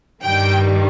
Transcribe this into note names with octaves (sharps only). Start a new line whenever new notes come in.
G2 D#3 G3 G5